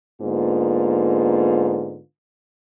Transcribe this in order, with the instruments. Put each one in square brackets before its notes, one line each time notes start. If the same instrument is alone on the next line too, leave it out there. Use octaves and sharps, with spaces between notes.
[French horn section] G#2 D3 A#3 B3 F4